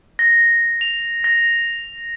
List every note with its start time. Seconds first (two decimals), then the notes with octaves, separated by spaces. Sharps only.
0.19 A#6
0.81 F7
1.24 A#6